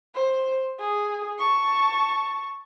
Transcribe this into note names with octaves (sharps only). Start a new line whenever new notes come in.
C5
G#4
A5 C#6